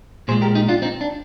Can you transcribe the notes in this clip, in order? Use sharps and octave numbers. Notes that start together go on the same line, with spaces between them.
A#2 G#3 G#4 C5
G4 A#4
D#4 G4
D4 F4
C4 D#4
D4